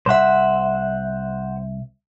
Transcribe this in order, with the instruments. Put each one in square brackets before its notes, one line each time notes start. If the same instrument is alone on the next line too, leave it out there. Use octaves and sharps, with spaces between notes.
[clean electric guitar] C2 E5 [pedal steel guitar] C5 F#5